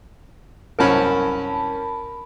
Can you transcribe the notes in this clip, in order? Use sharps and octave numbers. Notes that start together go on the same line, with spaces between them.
C2 F#2 C#4 A#4 A5 B5